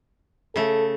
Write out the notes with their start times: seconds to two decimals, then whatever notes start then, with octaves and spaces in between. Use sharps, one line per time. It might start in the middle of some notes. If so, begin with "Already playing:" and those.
0.56 C#3 A3 A4